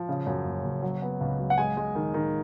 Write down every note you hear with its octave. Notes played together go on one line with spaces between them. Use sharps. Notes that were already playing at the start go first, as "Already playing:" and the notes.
Already playing: F3
C#3
F#2
F#1
F#1
F#3
B3
C#2
F#3
F#5
G#3 G#5
G#3
D#3
D#3